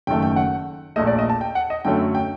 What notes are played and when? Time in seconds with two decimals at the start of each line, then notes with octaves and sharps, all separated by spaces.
0.07 F#1 F#2 D#3 A3 G5
0.22 G5
0.36 F#5
0.96 A#1 A#2 A3 D#5
1.07 D5
1.19 D#5
1.29 A5
1.41 G5
1.55 F#5
1.70 D#5
1.85 F#2 D3 F#3 A3 G5
2.15 G5